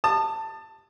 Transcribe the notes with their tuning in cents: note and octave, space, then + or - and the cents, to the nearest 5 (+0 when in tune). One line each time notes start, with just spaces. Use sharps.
A5 +15 D#6 -30